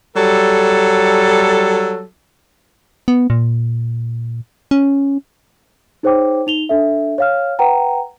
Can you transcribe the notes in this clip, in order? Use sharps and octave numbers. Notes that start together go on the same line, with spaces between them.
F#3 G3 A4
B3
A#2
C#4
D#4 G#4 C5 C#5 G5 D6
D#4 F7 G7
D4 A4 E5
C#5 F5 F6
B4 F#5 G5 A#5